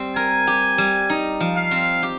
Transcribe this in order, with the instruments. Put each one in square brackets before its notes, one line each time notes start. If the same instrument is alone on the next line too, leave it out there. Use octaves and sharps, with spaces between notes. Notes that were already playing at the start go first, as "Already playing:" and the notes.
Already playing: [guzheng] G3 C4
[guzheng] A#4 [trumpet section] G#5
[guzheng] G4
G3
D#4
F3
[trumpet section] F5
[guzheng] C4
G4